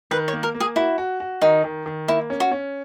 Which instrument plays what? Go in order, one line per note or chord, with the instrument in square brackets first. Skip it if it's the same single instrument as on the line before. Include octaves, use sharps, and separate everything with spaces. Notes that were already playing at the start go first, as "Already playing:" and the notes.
[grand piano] D#3 [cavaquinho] B4
[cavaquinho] C#5
[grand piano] A#3
[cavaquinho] A#4
[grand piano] A#3
[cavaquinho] G#4
[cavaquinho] E4 [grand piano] F#4
[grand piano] F#4
F#4
[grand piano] D#3 [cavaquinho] D#4
[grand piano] D#3
D#3
[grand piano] A#3 [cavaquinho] E4
[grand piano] C#4
[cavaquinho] F#4
[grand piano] C#4